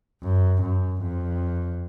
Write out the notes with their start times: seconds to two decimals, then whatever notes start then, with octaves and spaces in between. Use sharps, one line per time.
0.23 F#2
0.62 F#2
1.02 F2